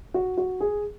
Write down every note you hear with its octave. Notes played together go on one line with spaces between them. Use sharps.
F#4
F#4
G#4